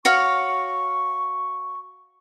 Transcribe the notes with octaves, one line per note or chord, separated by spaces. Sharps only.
F#4 C#5 F5 C#6